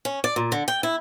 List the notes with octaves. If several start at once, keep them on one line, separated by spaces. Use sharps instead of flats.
C#4
D5
A#2
D3
G5
E4